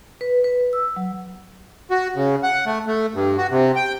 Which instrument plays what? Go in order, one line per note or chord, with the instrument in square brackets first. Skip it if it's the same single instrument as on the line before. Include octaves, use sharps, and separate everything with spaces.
[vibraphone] B4
B4
E6
F#3
[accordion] F#4
C#3
F#5
A3
A3
G2
F#4
C3
G5